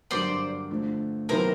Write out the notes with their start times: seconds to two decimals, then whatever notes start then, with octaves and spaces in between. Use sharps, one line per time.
0.11 G2 D3 F#3 A#3 C5 D5
0.71 D3 F3 A3
1.29 C3 D#3 F#3 B3 E4 A#4 C5